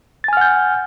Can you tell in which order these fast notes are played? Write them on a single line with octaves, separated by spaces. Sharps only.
A6 G#5 F6 F#5 G6